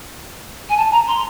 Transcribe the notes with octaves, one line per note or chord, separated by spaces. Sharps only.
G#5
A5
A#5
C6